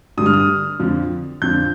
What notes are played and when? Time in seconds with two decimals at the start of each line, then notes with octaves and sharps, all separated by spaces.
0.17 G2 D3 G3 D#6
0.26 F6
0.34 D#6
0.80 F2 D3 F3
1.42 F2 D3 F3 G6